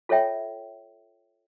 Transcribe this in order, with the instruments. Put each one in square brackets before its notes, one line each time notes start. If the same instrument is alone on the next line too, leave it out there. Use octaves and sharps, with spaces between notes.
[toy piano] F4 A4 C#5 E5 G5